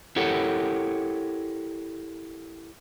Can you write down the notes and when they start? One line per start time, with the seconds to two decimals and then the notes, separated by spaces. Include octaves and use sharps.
0.16 E4 G4 A4 A#4 C#5 F#5